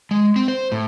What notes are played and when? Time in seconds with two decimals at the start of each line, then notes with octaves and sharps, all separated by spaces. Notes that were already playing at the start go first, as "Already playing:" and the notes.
0.11 G#3
0.36 C4
0.48 C5
0.72 A2